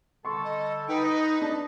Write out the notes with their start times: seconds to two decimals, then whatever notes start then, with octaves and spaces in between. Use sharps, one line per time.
0.25 D3 G3 A4 C6 C#6
0.44 D#5
0.88 D#4 B4 G5
1.01 B4 D#5
1.42 D4 A5